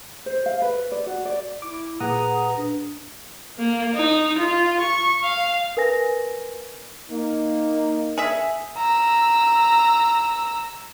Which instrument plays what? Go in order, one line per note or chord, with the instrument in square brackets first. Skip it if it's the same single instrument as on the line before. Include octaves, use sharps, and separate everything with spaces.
[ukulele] C5
F5
B4
D5
F#4
D5
[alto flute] E4 [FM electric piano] D6
[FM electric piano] A#2 F#5 D#6 [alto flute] G#4 [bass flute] B4 [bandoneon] A#5
[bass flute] D4
[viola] A#3
D#4
F4
C#6
F5
[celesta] A#4 B4 G#5 A#6
[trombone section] A#3 [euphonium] D#4
[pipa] G#4 E5
[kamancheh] A#5 E6